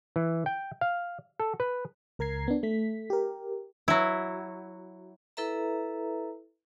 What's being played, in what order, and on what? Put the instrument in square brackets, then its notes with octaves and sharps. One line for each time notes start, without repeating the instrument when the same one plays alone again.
[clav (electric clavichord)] E3
G5
F5
A4
B4
[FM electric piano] C#2 A#4 A#5 G#6 C7
B3 D4
A3 B6
G4 A#4
[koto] F#3 E4
[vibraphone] E4 A4 B4 E5 A#5